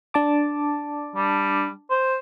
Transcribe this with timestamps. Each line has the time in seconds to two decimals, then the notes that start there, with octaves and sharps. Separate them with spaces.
0.14 D4 A5 D6
1.16 G3
1.90 C5